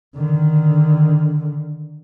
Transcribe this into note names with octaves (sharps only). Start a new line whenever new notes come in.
D3 D#3